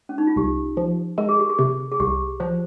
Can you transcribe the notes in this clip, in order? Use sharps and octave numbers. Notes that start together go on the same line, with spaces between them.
C#4
D#4
F4
C2 G4
F3
G#3 A#4
G#4
G4
G#4
C3
G#4
C2 G4
F3 C5